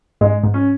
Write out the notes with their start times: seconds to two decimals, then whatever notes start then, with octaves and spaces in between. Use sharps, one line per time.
0.21 G#2 G#3
0.44 G#2
0.54 C#4